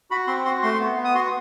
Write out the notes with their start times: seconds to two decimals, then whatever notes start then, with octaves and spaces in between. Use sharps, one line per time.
0.11 F#4 B5
0.27 C4 C6
0.45 F#4 C6
0.62 A3 C6
0.80 B3
0.97 B3
1.05 D#6
1.14 F#4 C6